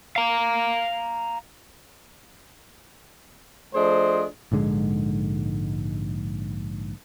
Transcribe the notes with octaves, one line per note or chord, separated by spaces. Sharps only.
F5 A#5
F3 A3 D4 G#4 C5 D#5
A#1 G#2 D3 G#3